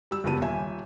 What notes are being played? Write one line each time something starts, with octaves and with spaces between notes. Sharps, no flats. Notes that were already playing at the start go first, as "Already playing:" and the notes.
G3 E6
F#1 F2 G3 B3 A5 D#7
D#1 E5 G#5